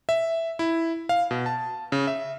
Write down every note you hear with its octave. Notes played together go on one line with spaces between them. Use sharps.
E5
E4
F5
B2
A5
C#3
E5